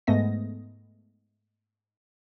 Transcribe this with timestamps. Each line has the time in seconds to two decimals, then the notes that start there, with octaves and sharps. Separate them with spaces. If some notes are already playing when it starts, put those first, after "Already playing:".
0.07 G#2 G#3 A3 B3 D#5 A#6